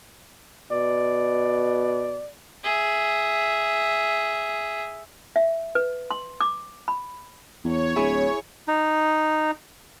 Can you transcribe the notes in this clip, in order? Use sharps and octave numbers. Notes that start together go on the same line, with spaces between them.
B2 D5
G#4 E5
E5
B4
C6
D6
B5
E2 C#5
D1 E4 G#4
D#4